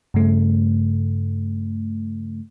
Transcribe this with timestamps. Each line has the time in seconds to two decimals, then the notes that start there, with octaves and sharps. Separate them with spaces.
0.14 G2 C#3 A3